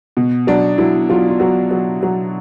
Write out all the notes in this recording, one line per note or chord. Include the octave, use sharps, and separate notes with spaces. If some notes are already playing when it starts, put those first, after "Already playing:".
B2
F#3 D4
F#3 E4
F#3 F4
F4
F#3 F#4
F#3
F#3